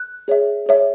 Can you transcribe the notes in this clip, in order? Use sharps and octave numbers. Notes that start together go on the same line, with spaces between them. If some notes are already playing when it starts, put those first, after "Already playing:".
Already playing: F#6
G#4 C#5 E5
G#4 C#5 E5